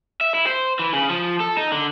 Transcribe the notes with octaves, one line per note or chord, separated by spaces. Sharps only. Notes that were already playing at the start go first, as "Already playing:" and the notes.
E5
E4
C5
E3
C#3
F3
A4
D#4
D3